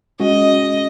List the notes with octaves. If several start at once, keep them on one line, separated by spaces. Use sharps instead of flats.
G#3 C#4 F#4 D#5